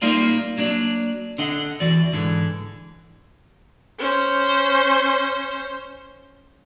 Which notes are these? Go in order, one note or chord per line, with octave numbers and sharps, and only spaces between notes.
G3 A#3 D#4 F4 D5
F#3 A#3 D4 D5
D3 D4 D#5 F#5
E2 E3 F#4 D5
G#2 D3 E3
C#4 C5